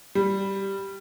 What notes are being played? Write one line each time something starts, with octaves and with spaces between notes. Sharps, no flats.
G3